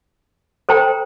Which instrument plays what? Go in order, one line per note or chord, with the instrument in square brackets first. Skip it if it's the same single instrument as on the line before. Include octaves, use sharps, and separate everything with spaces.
[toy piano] A4 C5 G5 A#5